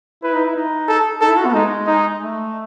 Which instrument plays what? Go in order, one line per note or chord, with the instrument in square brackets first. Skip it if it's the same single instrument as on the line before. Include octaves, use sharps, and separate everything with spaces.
[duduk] E4 [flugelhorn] B4
[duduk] D#4
E4
D#4
[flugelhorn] A4
[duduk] D#4 [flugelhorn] A4
[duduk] E4
F#4
B3
[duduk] G#3 [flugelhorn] D#4
[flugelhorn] D#4
[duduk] A3